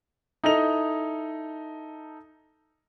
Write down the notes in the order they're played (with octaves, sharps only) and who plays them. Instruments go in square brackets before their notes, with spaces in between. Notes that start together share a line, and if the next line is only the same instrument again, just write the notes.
[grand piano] D#4 E4 A4 D#5 F7